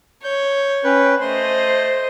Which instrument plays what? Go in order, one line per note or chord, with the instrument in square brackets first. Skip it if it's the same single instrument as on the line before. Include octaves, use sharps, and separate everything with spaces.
[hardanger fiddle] C#5 [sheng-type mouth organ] G6
[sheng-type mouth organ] C#4 B4 [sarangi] G5
[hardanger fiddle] A3 D#5 [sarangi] C5 [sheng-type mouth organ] C6